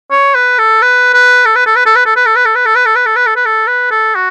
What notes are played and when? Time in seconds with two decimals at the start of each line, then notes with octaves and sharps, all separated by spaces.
0.11 C#5
0.35 B4
0.59 A4
0.82 B4
1.14 B4
1.46 A4
1.56 B4
1.66 A4
1.76 B4
1.86 A4
1.96 B4
2.06 A4
2.16 B4
2.26 A4
2.36 B4
2.46 A4
2.56 B4
2.66 A4
2.76 B4
2.86 A4
2.96 B4
3.06 A4
3.16 B4
3.26 A4
3.36 B4
3.46 A4
3.67 B4
3.91 A4
4.15 F#4